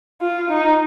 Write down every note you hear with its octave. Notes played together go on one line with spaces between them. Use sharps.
F4
D#4